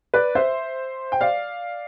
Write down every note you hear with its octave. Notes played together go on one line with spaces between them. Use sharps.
B4 D5
C5 E5
G5
D5 F5